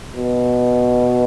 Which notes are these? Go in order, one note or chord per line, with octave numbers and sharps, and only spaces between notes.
B2